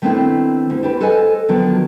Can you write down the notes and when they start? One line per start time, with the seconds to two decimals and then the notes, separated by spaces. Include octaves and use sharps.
0.02 D#3 A3 B3 C4 D4 E4
0.70 D2
0.83 D4 G4 B4
1.01 A4 B4 C5 D#5 F#5 G#5
1.49 D3 D#3 F3 F#3 B3 D4